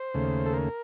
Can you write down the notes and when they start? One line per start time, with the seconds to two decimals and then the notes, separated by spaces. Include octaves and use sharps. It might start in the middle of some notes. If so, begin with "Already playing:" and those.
Already playing: C5
0.14 D#2 C#3 A3
0.46 A4
0.53 A#4